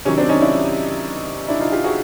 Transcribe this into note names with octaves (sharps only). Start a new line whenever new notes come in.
C3 D#3 F#3 C#4
C4 D4
C#4 D#4
D4 E4
D4 E4
D#4 F4
F4 G4
F#4 G#4